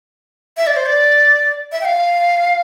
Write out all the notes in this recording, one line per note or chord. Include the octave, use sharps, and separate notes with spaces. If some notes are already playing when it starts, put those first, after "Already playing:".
E5
D5
C5
D5
E5
G5
F5